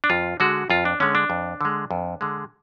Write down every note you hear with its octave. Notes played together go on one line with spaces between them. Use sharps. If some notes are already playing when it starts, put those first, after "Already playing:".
D4
F2 F4
D3 G#3 F#4
F2 F4
D4
D3 G#3 C#4
D4
F2
D3 G#3
F2
D3 G#3